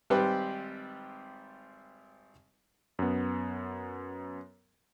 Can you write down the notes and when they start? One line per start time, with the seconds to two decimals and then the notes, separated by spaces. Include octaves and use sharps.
0.10 G#1 G3 C4 G4 B4 C5
2.99 F#2 B3